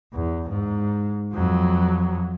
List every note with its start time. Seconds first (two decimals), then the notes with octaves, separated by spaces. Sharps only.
0.13 E2
0.50 G#2
1.34 F2 F#3